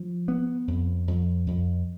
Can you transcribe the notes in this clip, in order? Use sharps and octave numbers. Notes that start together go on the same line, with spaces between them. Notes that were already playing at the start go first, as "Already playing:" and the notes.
Already playing: F3
B3
F2
F2
F2